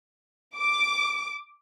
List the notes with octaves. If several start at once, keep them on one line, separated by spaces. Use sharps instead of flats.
D6